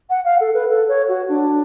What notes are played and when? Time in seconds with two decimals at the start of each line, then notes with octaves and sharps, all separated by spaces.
0.09 F#5
0.24 F5
0.39 A4
0.54 B4
0.69 A4
0.88 C#5
1.08 F#4
1.28 D4